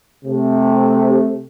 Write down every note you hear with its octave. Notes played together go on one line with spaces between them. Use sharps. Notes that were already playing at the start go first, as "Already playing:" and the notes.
C3 A3